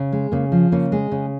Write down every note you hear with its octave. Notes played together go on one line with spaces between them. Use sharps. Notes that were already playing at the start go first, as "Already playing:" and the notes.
Already playing: C#3
G#3
C#3 A#3
F3
C#3 A#3 C#4
G#3
C#3